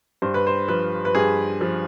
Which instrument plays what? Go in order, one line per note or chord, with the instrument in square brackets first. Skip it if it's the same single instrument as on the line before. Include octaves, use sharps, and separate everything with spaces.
[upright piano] G2 C5
B4
C5
F3 B4
B4
G2 G#4
F3